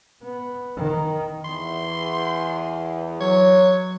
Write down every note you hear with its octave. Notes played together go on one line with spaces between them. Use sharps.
B3
D#3
E2 C6
F#3 C#5